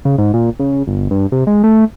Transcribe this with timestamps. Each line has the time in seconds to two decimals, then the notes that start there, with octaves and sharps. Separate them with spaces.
0.05 C#3
0.18 G#2
0.34 A#2
0.60 C#3
0.87 G1
1.11 G2
1.32 C3
1.47 G#3
1.64 A3